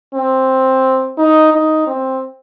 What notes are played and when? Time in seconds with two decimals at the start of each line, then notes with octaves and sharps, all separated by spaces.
0.14 C4
1.18 D#4
1.52 D#4
1.87 C4